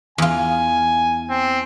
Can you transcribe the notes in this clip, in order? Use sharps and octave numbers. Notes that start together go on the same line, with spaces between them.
E2 F4 G#5
C4